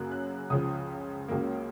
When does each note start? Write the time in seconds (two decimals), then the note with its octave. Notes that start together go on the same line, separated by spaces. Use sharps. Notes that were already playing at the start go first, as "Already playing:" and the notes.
Already playing: F#2 C#3 F#3 A#3 F#6
0.11 F#6
0.50 C#2 C#3 F3 D#6
1.28 C#2 C#3 F#3 A#3